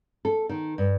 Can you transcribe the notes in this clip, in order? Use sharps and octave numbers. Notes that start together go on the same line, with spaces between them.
A4
D#3
G2